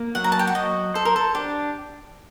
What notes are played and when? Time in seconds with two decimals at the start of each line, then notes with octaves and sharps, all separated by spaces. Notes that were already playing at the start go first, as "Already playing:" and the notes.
Already playing: A#3
0.15 F#3 F#5
0.24 A#5
0.32 A5
0.39 G5
0.47 F#5
0.55 F#4 D#5
0.94 A4 C5
1.05 A#4
1.16 A4
1.35 D4 G4